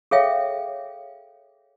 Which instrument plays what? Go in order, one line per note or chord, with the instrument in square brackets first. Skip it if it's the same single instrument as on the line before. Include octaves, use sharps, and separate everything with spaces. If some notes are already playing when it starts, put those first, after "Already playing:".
[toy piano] G#4 A4 C#5 E5 F5 G5